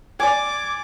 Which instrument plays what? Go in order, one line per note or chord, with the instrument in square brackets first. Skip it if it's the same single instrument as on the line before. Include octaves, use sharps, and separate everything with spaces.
[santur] D5 G#5 [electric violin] D6